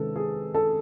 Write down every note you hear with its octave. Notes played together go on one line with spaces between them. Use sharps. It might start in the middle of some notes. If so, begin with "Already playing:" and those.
Already playing: C3 D#3 G#3 C#4 A4 B4
G#4
A4